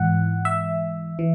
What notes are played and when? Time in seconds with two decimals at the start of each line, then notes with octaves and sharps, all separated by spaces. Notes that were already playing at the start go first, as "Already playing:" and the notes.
Already playing: G#2 E3 F#5
0.45 E5
1.19 E3